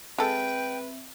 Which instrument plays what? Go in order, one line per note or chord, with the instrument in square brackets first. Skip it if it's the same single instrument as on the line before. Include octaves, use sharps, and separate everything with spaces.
[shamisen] G#3 A4 [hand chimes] C4 E5 [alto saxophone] B4 [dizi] G5